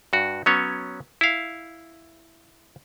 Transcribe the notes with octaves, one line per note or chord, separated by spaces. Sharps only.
G2 F#4
F#3 B3 C#4 C#5
E4 F5